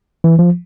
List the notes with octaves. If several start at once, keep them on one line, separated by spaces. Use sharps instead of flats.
E3
F3